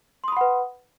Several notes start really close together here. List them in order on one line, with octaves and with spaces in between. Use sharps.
C6 D#6 B5 F#5 B4